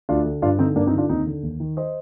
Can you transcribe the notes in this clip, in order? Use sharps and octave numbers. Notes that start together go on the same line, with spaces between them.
D2 D4 F4
D3
G2 D4 F4
D3 C4 D#4
G2 A#3 D4
C4 D#4
D3 D4 F4
D#2 C4 D#4
D3
D#2
D#3
C5 D#5